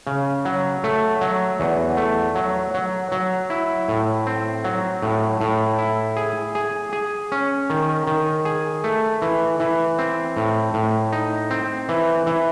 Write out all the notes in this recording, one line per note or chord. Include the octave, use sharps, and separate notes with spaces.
C#3
F#3
A3
F#3
E2
A3
F#3
F#3
F#3
E4
A2
C4
F#3
A2
A2
E4
G#4
G#4
G#4
C#4
D#3
D#3
G#4
A3
E3
E3
C4
A2
A2
D#4
C4
E3
E3